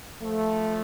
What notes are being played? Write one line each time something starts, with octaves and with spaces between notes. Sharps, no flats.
F3 A3